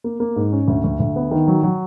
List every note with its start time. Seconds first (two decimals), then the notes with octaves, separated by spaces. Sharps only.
0.04 A#3
0.20 A#3
0.36 G#2
0.52 C#4
0.68 D2
0.84 D2
1.00 D2
1.16 B3
1.31 D#3
1.48 F#3
1.63 F#3